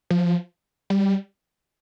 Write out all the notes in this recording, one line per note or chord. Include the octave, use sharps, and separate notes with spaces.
F3
G3